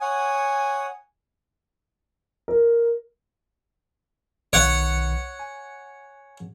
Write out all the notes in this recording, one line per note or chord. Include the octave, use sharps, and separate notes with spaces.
C#5 F#5 G#5 D#6
A#4
B1 D#3 B4 C#5 F#5
G#5